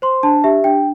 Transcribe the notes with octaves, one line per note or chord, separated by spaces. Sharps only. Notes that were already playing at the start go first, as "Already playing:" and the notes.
C5 C6
D4 A5
G4 E5
D4 G5